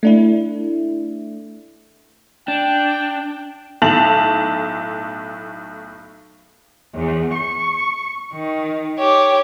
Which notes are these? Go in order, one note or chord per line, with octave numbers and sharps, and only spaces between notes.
A3 D4 E4
D4 G5
B1 A2 A5 F7 F#7
E2
C#6
D#3
G4 C#5